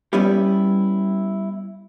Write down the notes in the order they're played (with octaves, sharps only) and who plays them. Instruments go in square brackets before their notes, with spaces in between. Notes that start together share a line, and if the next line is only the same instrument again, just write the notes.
[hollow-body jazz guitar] G3 B3 C#4 E4 G4